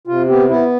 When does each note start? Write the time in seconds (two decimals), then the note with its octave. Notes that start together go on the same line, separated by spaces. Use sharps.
0.07 C3 F4
0.28 B3 G4
0.49 B3 E4